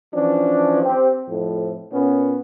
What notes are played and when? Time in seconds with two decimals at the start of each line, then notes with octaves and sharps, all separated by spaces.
0.14 E3 F3 C#4 D4
0.83 C4 G4
1.29 F2 A2 F3
1.93 A#2 B3 C#4